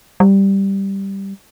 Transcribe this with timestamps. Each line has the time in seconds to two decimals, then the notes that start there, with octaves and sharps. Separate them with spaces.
0.20 G3